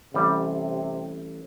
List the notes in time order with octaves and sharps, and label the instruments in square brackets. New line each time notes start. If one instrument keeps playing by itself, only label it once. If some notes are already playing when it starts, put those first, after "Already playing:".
[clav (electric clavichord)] A1 G3 [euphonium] C3